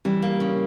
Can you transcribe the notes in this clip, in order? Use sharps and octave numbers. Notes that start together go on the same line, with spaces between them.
E3 G3
A#3
C#3